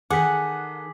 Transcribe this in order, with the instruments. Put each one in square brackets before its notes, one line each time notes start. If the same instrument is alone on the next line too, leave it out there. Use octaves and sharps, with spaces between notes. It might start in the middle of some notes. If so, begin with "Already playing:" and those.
[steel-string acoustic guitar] D#3 A4 [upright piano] G#4 [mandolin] F#5 [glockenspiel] D6 B6